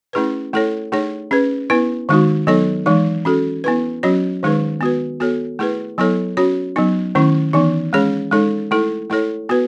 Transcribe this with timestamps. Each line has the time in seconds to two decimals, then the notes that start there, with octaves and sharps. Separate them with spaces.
0.13 A3 C#4 E4 G#4 B4
0.53 A3 E4 A4 C#5
0.92 A3 D#4 G#4 C#5
1.31 C#4 G#4 B4
1.70 B3 E4 B4
2.09 D#3 G#3 D#4 F#4
2.47 F#3 B3 D#4 A4 C#5
2.86 E3 G#3 D#4
3.25 C#4 F#4 A4
3.64 B3 E4 B4
4.03 F#3 C#4 F#4 C#5
4.43 D#3 G#3 D#4 G#4 B4
4.81 B3 F#4 B4
5.20 B3 F#4 A4 C#5
5.59 A3 E4 G#4 B4
5.98 F#3 B3 E4 A4 C#5
6.37 C#4 F#4 C#5
6.76 F#3 B3 D#4
7.15 D#3 A3 C#4 E4
7.53 E3 B3 D#4
7.93 G#3 C#4 G#4 C#5
8.31 G#3 D#4 A4 C#5
8.71 A3 E4 A4
9.10 A3 E4 A4 C#5
9.49 B3 F#4 B4